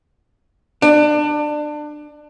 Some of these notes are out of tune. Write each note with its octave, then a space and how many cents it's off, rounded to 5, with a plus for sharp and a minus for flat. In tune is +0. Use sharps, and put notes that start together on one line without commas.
D4 +25